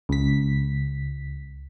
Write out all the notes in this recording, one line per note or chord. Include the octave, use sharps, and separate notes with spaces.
C#2 B6